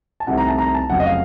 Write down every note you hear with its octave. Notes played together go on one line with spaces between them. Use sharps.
A5
C2 C3 D#3 A3 F#5
A#5
A5
A#5
A5
F1 F2 C#3 F#3 F#5
D#5
F5